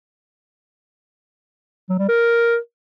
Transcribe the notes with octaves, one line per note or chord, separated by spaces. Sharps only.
F#3
G3
A#4